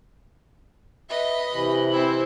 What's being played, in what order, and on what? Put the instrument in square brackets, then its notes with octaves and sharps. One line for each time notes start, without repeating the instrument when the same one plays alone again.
[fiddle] B4 D#5 [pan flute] E5
[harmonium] C3 E3 [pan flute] B5
[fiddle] C4 E4